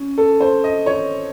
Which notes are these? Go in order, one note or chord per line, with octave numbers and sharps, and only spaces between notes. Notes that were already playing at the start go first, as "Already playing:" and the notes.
Already playing: C#4
A4
C5
D#5
C#5